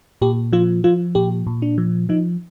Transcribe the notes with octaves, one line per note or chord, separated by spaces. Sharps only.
A#2 G4
F3 F4
F3 F4
A#2 G4
A#2
D4
F3
F3 D#4